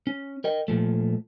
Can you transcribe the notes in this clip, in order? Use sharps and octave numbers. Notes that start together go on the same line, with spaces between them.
C#4
A#4 D#5 G5
A#2 F3 A3